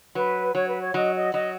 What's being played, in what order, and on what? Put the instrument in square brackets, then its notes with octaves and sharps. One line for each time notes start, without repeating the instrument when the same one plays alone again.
[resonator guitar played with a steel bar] F#3 [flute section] B4
[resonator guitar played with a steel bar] F#3 [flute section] C#5
[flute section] B4
C#5
[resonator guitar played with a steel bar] F#3 [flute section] D#5
[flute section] D#5
[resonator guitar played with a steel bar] F#3 [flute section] D#5